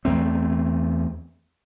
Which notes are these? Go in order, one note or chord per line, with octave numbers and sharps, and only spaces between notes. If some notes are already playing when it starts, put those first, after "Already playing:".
E2 A3 C4